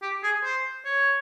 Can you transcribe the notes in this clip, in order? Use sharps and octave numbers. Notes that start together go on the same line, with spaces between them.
G4
G#4
C5
C#5